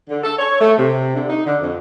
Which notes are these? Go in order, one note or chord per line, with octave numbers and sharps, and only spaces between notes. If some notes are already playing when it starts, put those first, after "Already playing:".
D3
A4
C#5
A3
C3
D3
D#4
D3
F2